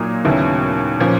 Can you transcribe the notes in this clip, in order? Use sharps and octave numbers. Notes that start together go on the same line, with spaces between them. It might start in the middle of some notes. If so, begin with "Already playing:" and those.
Already playing: A#2 F#3 A#3 D#4
D#2 C#3 F#3 B3 E4
A#2 F3 A#3 C#4